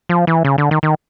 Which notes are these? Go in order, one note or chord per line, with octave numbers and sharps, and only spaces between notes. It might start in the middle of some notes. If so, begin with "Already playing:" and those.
F3
E3
C#3
D3
D#3
D#3